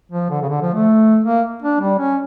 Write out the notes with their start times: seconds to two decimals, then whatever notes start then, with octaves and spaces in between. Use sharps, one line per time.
0.12 F3
0.30 D3
0.42 C#3
0.49 D3
0.62 F3
0.74 A3
1.24 A#3
1.62 D4
1.80 G3
1.99 C#4